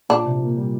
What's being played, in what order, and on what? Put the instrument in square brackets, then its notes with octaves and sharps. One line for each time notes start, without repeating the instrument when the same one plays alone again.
[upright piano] A#2 [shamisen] D4
[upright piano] C3
A#3
G3